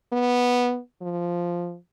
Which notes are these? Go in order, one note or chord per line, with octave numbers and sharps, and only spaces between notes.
B3
F3